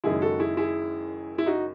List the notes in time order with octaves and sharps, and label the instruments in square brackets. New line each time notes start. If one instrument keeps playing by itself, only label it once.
[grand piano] F#1 F#2 D#3 G#3 E4 G#4
F#4 A4
E4 G#4
E4 G#4
E4
D#4 F#4